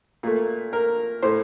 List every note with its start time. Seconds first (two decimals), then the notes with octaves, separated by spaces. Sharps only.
0.23 A#2 A3
0.73 A#4
1.22 A2 A3 C5